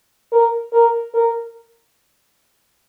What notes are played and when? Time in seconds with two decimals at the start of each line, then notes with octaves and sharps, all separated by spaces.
0.32 A#4
0.73 A#4
1.14 A#4